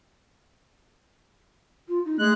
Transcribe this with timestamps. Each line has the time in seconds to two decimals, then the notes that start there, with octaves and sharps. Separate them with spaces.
1.88 F4
2.05 D#4
2.19 G#3 A3 F#6